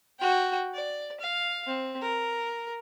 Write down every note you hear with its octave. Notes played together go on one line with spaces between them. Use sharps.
F#4 G5
D5
F5
C4
A#4